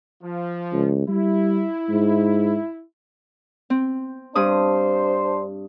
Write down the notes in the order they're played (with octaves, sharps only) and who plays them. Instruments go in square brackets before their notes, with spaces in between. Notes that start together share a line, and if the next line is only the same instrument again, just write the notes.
[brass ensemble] F3
[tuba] C#2
[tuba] G3 [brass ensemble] E4
[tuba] G#2
[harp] C4
[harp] G2 D#6 [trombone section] D4 C5